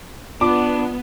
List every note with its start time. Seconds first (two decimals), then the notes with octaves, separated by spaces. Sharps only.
0.41 B3 D4 F4 D6